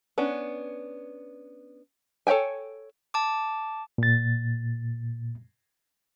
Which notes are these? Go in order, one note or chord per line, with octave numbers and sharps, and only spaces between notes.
B3 C#4 D4
A4 C#5 E5 G5 G#5
A5 D6
A#2 A6